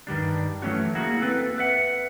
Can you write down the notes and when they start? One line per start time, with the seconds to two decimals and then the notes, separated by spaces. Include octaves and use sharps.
0.07 G2 D#3 G3 D4
0.62 E3 F#3 A3 C#4 F#4
0.95 A#3 E4 F#4 G#4
1.21 C4 A4 B4
1.58 B4 E5 F#5